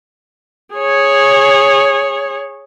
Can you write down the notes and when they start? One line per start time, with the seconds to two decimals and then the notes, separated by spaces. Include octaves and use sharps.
0.75 G#4 C#5